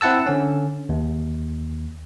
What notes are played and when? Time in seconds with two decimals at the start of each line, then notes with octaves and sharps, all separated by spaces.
0.01 C4 E4 F#5 A5 E6
0.27 D3 C#4
0.89 D#2